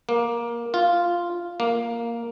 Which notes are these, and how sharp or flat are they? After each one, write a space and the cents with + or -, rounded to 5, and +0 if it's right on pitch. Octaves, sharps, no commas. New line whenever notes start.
A#3 +15
F4 -5
A#3 +0